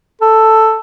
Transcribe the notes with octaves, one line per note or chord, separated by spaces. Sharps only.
A4